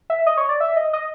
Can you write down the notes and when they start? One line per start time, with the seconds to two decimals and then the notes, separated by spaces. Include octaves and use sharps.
0.10 E5
0.26 D#5
0.37 C#5
0.49 D5
0.60 E5
0.76 D#5
0.93 D#5